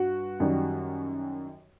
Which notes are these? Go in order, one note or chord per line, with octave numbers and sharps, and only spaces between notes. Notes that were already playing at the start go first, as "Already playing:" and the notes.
Already playing: G2 F#4
F#2 D#3 G3